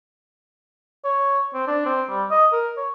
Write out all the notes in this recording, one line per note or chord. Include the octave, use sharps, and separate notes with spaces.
C#5
C4
D4
C4
G3
D#5
A#4
C#5